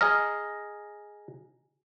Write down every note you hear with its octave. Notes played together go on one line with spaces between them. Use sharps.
G#4 D#5 A#5 F6